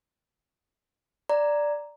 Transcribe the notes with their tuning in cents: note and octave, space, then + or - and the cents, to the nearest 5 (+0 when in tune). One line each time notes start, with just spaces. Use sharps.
D5 +0 A#5 +0